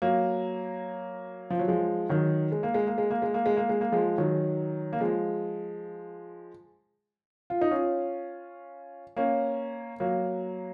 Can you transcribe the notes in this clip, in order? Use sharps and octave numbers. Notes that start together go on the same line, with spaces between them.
F#3 A#3
F3
F#3
F3 G#3
D#3 F#3
G#3
A#3
G#3
A#3
G#3
A#3
G#3
A#3
G#3
A#3
G#3
A#3
F3 G#3
D#3 F#3
A#3
F3 G#3
F4
D#4
C#4 F4
A#3 C#4
F#3 A#3